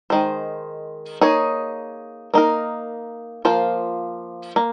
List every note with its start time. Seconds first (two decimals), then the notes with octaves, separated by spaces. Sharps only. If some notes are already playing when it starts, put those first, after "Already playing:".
0.10 D#3 G#3 C5
1.21 A#3 D#4 G#4 C#5
2.34 A#3 D#4 A#4
3.45 F3 A#3 F4 C5
4.56 A#3